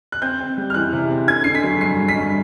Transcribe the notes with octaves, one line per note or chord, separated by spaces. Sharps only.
F#6
C4 G6
C4
G3
F6
E3 F#6
C3
C4
D3 G#6
D3 C7
B6
F#3
G2 C7
G2
B6
G2